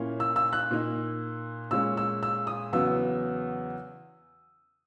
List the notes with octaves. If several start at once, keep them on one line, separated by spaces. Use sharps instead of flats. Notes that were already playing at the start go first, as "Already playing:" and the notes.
Already playing: A#2 A#3 C#4 E4
E6
E6
F#6
A#2 A#3 D#4
A#2 G#3 C#4 E6
E6
E6
D#6
E2 C#3 F#3 B3 E6